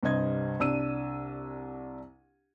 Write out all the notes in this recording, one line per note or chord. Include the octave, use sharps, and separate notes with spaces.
C2 G2 C3 C5 D#5 G#6
C2 D4 E6 D#7